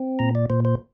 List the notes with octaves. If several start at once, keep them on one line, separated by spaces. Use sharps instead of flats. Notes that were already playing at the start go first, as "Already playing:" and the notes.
Already playing: C4
A#2 A#5
D5
A#2 C5
C5